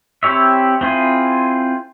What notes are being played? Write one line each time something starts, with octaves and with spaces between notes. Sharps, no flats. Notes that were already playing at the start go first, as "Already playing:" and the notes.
C4 E4 G4 C#5 E5
C4 E4 F4 G#4